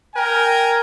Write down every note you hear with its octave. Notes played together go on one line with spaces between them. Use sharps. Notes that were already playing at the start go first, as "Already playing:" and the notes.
A#4 G5 G#5